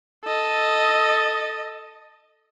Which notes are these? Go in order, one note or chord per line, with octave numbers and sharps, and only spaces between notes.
A4 D#5